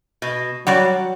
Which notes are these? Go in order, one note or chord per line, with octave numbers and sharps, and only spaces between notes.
B2
F#3 G3 F#4 D5 F#5